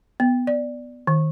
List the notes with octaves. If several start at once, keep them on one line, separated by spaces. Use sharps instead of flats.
B3
D5
D#3